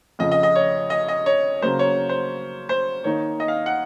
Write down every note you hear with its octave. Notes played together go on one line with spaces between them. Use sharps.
F2 C#3 F3 D#5
D#5
D#5
C#5
D#5
D#5
C#5
C#3 F#3 A#3 C5
C#5
C5
C5
D#3 A#3 D#4 C#5
D#5
F5
F#5